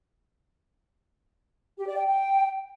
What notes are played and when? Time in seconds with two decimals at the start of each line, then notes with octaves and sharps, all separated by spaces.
1.77 G4
1.87 D5
1.97 G5
2.07 G5